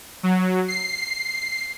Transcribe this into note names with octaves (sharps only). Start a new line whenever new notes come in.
F#3
C7